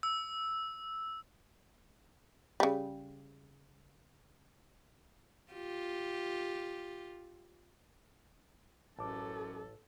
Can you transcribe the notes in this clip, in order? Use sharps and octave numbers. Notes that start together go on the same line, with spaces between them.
E6
C#3 G3
F4 G4
A1 F#2 A4 A5 D6